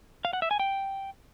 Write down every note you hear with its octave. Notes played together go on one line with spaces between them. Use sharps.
F5
F#5
E5
G#5
G5